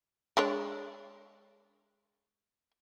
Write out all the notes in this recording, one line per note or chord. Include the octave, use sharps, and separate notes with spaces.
G#3 D4 C#5